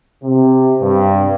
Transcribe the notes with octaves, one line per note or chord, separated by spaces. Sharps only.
C3
G2